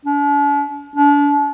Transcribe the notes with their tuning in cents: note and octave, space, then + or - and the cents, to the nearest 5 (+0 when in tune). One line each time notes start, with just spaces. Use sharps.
D4 -45
D4 -35